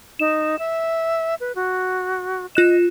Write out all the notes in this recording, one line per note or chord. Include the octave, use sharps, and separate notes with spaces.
D#4 E7
E5
B4
F#4
F4 D#5 F#6 E7